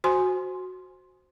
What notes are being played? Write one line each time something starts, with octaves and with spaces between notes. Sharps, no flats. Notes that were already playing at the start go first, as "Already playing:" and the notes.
F#4 C5 G#5 C6